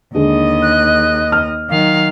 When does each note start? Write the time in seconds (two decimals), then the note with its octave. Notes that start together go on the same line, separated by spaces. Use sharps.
0.15 D#2 D3 G#3 D#5
0.62 F#6
1.32 F6
1.70 D#3 F#3 F5